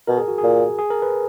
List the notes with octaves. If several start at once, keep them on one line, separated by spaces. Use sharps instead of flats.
B2 A#4
G#4
F#4
G#4
A#2
G#4
A#4
B4